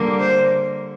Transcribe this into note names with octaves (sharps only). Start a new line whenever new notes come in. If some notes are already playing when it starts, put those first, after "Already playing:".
Already playing: D3 G3 A#3
C5